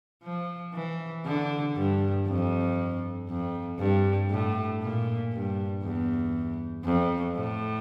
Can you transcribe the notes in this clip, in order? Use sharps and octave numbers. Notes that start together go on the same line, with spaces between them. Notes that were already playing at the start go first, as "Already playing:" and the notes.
F3
E3
D3
G2
F2
F2
G2
A2
A#2
G2
E2
F2
A2